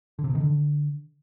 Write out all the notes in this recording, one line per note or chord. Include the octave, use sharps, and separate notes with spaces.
D3
C3
B2
D#3
D3